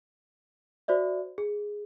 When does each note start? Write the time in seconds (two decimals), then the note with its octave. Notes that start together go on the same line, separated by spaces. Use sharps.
0.88 F#4 C5 D5 E5
1.38 G#4